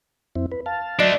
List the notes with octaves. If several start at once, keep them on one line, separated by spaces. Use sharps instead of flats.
F2 C4 E4
B4
F5 A5
F#3 A3 D4 D5 D#5 C7